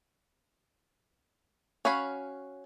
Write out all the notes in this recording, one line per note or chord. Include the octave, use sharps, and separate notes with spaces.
C#4 F#4 C#5 F5 B5